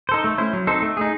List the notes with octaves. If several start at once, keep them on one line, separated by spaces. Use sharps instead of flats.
D#4 A4 C5
A3
C#4 E4 C5
F#3
C4 D#4 A4 C5
A3
D#4 G#4